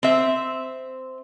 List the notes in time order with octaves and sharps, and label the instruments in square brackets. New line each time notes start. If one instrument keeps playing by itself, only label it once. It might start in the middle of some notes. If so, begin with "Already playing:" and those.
[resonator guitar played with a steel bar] C4 E5